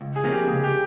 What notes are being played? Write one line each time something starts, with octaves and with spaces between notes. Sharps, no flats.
C#2
G#4
C3 F3 A#3 C#4
G4
C#2 G#4
G4